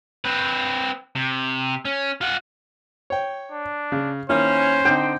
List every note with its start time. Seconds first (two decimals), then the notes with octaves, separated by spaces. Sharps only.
0.25 C4 B4
1.16 C3
1.85 C#4
2.21 F4 F#5
3.10 C#5 G5
3.52 D4
3.92 C#3
4.30 D#3 A#3 C#4 E4 C5
4.85 D3 C4 D#4 G5